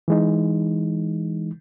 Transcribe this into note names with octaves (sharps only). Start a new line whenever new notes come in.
E3 G#3 D#4